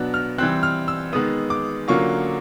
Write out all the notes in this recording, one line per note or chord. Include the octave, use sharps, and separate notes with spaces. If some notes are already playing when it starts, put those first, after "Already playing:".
Already playing: B2 F#3 B3 D4 F#6
F6
E3 G3 C4 F#6
F6
E6
D#3 G#3 B3 D#6
D6
D3 F#3 A#3 C#4 F4 C#6